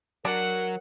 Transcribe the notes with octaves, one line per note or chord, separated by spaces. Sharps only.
F#3 D4 A#4 F#5